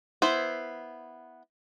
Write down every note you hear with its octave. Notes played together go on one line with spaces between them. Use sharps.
B3 E4 C5